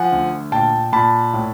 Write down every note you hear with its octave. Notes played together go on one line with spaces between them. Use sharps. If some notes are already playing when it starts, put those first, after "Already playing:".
Already playing: F3 F#5 G#5
D2
A#2 G5 A5
A#2 A5 B5
A2